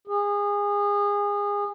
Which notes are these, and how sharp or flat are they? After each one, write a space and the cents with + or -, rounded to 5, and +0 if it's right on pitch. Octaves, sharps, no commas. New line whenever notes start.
G#4 -25